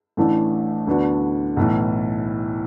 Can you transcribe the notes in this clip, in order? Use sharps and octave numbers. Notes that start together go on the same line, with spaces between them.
A1 A2 E3 A3 D4
D2 D3 B3 D4 F#4
B1 A2 E3